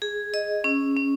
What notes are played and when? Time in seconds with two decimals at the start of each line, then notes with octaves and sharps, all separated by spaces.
0.02 G#4
0.34 D#5
0.64 C#4
0.97 C#4